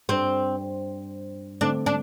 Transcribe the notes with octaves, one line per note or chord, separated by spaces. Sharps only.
G2 G3 C4 D4 C5
D3 A3 C4 D4
D4